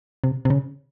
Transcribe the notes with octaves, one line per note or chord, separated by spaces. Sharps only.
C3
C3
C#3